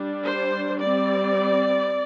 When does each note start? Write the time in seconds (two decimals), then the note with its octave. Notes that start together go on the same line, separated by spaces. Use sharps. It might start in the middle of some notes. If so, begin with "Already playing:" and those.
Already playing: G3 D4
0.25 C5
0.79 G3 C4 D5